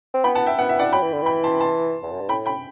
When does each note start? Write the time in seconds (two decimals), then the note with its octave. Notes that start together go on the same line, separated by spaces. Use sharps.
0.14 C4
0.24 B3 G5 B5
0.35 F#5 A5
0.46 E5 G5
0.58 B3 F#5
0.69 E5
0.79 D5 F#5
0.93 F#3 G5 B5
1.03 E3
1.13 D3
1.22 E3 G5 B5
1.44 A5 C6
1.60 A5 C6
2.03 E2
2.12 F#2
2.21 G2
2.29 A2 G5 B5
2.46 G5 B5